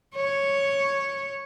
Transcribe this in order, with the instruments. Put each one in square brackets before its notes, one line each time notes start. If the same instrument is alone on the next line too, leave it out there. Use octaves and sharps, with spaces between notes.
[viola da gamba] C#5